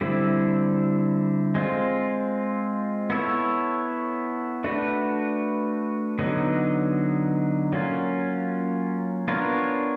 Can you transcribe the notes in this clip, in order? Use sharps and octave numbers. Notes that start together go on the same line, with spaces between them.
D3 G3 C4 E4
G#3 C4 F4
B3 E4 A4 C#5
A3 D4 F#4 B4
D3 F#3 B3 D#4
F#3 A#3 C#4 F4
B3 D4 F4 A#4 C#5